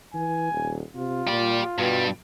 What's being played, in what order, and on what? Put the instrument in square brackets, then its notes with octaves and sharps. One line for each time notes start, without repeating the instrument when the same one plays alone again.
[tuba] E3 [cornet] G#5
[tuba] D#1
[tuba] C3 [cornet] F4
[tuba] A#2 [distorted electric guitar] G4 D5
[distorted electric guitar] G2 G3 [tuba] B2